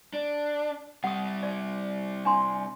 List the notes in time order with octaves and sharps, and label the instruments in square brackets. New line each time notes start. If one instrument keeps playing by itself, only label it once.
[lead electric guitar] D4
[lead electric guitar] C3 G3 [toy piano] F#5 D#6
[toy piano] D5
D4 G#5 C6